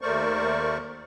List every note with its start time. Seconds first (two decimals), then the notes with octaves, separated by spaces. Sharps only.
0.01 D#2 A3 A#4 C5 D5 C#6